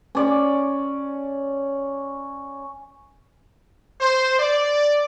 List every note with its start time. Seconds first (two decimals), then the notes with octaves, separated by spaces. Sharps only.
0.15 C#4 D5
3.99 C5
4.38 D5